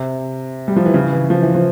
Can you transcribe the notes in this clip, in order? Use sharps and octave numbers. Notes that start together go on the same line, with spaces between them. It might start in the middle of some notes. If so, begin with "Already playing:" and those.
Already playing: C3
G3
F3
E3
C#3
E3
F3
E3
F3